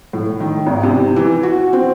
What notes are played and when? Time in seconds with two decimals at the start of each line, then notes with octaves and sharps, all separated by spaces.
0.13 A2
0.40 D#3
0.67 G#1
0.83 C3
1.16 E3
1.43 F#4
1.73 C4